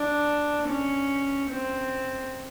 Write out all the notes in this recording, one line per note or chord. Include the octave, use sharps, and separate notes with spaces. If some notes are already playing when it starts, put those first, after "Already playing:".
Already playing: D4
C#4
C4